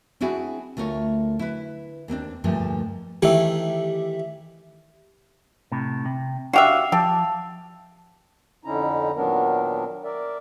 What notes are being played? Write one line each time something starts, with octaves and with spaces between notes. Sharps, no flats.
C4 D4 E4 F#4 G#4
D2 A3 F4 A#4 C#5
E4 B4
D#2 B3 C4 D4
D2 G2 A#2 F3 G#3 A3
D#3 E3 A3 G4 E5
A2 C3
C3
D4 F#4 G4 E5 F5 C7 F7
F3 G4 A5 E6
F2 D3 C#4 D#4 E4 A#5
A#2 D#3 F#3 B3 D4 A#4
A#4 D5 E5